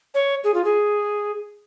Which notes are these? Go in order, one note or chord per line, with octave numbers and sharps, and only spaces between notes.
C#5
G#4
F4
G#4